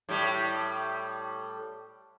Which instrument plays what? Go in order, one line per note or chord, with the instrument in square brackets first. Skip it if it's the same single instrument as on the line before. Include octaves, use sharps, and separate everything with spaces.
[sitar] A2 G3